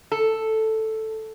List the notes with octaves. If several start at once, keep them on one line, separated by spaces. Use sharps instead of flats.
A4